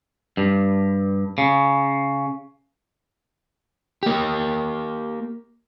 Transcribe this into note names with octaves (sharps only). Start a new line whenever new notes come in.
G2
C#3
A#3 G4